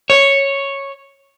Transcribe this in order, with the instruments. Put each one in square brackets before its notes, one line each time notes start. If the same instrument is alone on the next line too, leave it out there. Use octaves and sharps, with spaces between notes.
[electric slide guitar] C#5